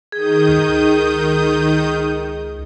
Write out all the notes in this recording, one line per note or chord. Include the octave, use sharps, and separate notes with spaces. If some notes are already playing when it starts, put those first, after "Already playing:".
D#3 G#4 D#6 G6
C#2